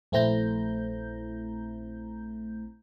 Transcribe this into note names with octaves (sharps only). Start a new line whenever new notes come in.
A#1 A3 C4 E4 A#5 G6